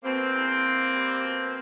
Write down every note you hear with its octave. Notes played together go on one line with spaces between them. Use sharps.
B2 A#3 C4
E2
E2
G3
B2